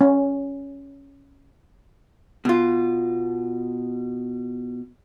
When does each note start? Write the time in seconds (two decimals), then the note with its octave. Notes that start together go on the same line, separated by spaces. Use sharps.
0.01 C#4
2.45 B2 F4